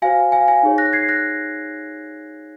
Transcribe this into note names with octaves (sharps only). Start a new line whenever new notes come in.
F#4 C5 F5 G#5
F5 G#5
F5 G#5
D#4 G#4 C#5
F#6 A#6
G#6 C7
F#6 A#6